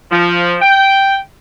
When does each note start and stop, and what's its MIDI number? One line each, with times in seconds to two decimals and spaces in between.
0.12 0.56 53
0.62 1.18 79